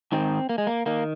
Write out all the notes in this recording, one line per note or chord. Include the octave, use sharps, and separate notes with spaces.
G#2 D#3 C4
A#3
G#3
A#3
D#3 A#3